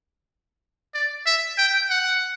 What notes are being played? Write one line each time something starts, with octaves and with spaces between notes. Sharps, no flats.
D5
E5
G5
F#5